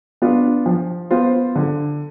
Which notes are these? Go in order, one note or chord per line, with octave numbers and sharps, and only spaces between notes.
B3 D4 F4
F3
B3 F4 C5
D3